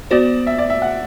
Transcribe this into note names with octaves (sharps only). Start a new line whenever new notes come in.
B3 F#4 C5 D5
E5
D5
E5
F#5